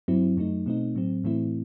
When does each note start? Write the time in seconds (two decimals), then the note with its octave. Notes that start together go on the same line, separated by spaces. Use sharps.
0.08 G2 F#3 C4 E4
0.37 F#2 F#3 A3 D#4
0.66 B2 A3 C4 D#4
0.95 A2 F#3 C4
1.24 A2 E3 A3 C4 E4